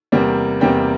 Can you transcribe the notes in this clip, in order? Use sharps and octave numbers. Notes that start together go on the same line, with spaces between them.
E2 C3 G3 A#3
E2 C3 G3 A#3 G5